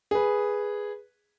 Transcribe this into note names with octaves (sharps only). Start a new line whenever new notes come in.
G#4 B4